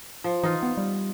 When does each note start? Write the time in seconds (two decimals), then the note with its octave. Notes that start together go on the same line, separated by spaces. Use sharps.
0.24 F3
0.43 E3 D#4 F4
0.63 B3
0.77 G3